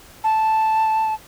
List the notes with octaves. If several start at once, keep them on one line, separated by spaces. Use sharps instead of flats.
A5